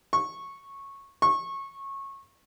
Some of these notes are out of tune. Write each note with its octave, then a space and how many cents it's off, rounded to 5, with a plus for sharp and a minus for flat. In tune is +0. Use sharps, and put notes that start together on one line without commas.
C#6 -10
C#6 -20